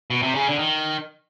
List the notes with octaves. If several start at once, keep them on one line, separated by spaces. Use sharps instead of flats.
B2
C3
C#3
D3
D#3